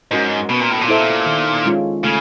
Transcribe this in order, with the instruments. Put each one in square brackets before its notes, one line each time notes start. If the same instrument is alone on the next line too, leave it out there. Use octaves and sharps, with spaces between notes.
[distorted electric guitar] G#2 [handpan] C#4 F#4 A#4 D#5
[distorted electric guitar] B2 [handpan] B3
[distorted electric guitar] A#2
A2
A#2
[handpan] E4 A4 C5 E5
D#3
G#3 C#4 F4
[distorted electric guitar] C#3 [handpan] A3